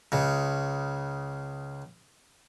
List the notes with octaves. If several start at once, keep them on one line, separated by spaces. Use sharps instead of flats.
C#2 C#3